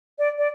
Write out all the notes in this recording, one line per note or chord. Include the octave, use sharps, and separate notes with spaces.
D5
D5